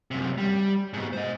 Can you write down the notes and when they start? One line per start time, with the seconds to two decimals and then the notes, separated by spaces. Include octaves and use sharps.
0.11 F#2 C3
0.38 G3
0.93 G#2 B2
1.13 C5 D#5